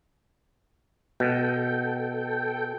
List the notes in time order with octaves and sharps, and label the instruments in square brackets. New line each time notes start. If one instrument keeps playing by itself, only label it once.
[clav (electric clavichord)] B2 [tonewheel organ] A4 G5